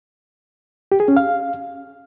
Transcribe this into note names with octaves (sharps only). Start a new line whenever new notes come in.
G4
G#4
C#4
F5